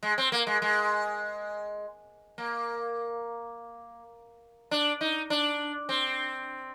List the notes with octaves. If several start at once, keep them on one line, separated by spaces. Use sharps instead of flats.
G#3
C4
A#3
G#3
G#3
A#3
D4
D#4
D4
C4